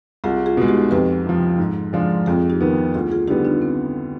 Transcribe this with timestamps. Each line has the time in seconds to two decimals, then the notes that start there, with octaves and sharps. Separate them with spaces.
0.24 C2 F4 G#4
0.46 F4 G#4
0.57 B2 G#3
0.68 D#4 G4
0.91 F2 G4 B4
1.26 C3 F3
1.58 G#2
1.93 F3 G#3 D4 F4
2.26 F2 F4 G#4
2.50 D#4 G4
2.61 D#3 B3
2.94 D2 F4 G#4
3.11 F4 G#4
3.28 D3 G3 B3 D#4 G4
3.45 D4 F4
3.62 C4